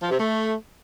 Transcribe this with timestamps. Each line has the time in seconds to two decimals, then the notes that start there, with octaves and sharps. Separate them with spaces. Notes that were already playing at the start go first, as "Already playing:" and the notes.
0.01 F3
0.10 C3
0.19 A3